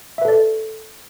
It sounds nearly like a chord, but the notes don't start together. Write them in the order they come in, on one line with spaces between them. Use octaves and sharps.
E5 B4 A4 D5